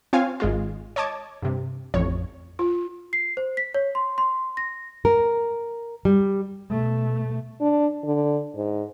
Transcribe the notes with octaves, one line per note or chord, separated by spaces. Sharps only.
C4 F4 C#5 F5 G#5
G#1 G#3 F4
C#5 D#5 A5 D6 G#6
G2 C3
A1 F2 C#5
F4
C7
C5
B6
C#5
C6
C6
A#6
A#4
G3
B2 A3
D4
D3
G#2